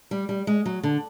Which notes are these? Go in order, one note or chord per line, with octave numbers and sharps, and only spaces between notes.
G3
G3
G#3
F#3
D3